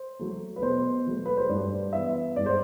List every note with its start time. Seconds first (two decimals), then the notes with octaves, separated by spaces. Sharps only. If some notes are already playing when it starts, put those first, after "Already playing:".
Already playing: C5
0.19 F#3 A3
0.56 B4
0.62 B2 C5
1.07 F#3 A3
1.26 B4
1.37 C5
1.49 G2 D5
1.93 E3 B3 E5
2.36 G2 D5
2.46 C5